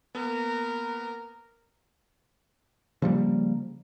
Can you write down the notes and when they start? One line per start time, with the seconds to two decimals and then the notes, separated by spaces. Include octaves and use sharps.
0.15 A#3 B3 A#4
3.02 C#3 F3 G3 A#3